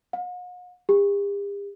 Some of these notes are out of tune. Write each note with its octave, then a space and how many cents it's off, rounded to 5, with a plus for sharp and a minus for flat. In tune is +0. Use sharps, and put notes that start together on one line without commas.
F#5 -45
G4 +45